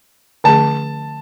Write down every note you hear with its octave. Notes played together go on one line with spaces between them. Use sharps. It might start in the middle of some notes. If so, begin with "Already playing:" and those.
D3 F3 A3 C#4 G#4 A5